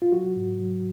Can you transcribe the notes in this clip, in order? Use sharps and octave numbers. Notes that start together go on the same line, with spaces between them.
F4
F#3 F#4
G#2
F#3